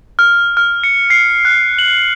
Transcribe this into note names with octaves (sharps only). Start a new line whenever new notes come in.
F6
F6
C#7
C7
F#6
F#7